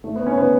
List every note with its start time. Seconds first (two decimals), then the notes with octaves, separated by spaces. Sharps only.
0.04 A3
0.16 B3
0.27 C#4
0.38 B3